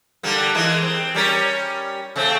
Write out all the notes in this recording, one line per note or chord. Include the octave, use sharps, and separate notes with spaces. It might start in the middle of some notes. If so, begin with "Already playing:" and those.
D3 G3 A#3
E3 G#3 A#3
C4
G3 C#4 A#4
C#3 A3 C4